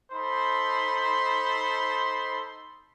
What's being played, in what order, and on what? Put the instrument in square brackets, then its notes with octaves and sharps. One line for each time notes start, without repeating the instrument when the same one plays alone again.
[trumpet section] D#4 A4 C5 B5 C6